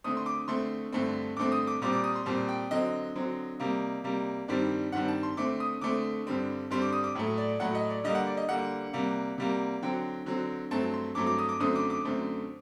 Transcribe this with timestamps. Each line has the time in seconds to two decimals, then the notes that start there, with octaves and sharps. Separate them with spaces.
0.04 D3 A3 C4 D#6
0.17 C6
0.26 D6
0.48 D3 A3 C4 C6
0.92 G2 D3 A3 C4
1.37 G2 D3 A3 C4 D6
1.52 D#6
1.67 D6
1.82 A#2 G3 C4 D6
1.93 D6
2.04 D#6
2.15 C6
2.26 A#2 G3 C4 A5
2.49 G5
2.71 D3 F#3 C4 D#5
3.15 D3 F#3 C4
3.60 C3 G3 A#3
4.04 C3 G3 A#3
4.48 G2 D#3 G3 C4 D5
4.92 G2 D#3 G3 C4 F#5
5.08 A5
5.23 C6
5.37 D3 A3 C4 D6
5.60 D#6
5.81 D3 A3 C4 D6
6.27 G2 D3 G3 C4
6.70 G2 D3 G3 C4 C6
6.82 D6
6.93 D#6
7.04 D6
7.15 A2 F#3 A3
7.38 D5
7.60 A2 F#3 A3 F#5
7.75 D#5
7.90 D5
8.04 D3 G3 A#3 D#5
8.15 F#5
8.27 D5
8.37 D#5
8.49 D3 G3 A#3 F#5
8.93 C3 G3 A#3
9.38 C3 G3 A#3
9.82 D3 F#3 C4 G5
10.26 D3 F#3 C4
10.71 G2 F#3 A3 C4 A5
10.93 C6
11.15 G2 F#3 A3 C4 D6
11.27 D6
11.38 D#6
11.49 D6
11.60 F#2 D3 A3 C4 D#6
11.76 D6
11.90 D6
12.05 F#2 D3 A3 C4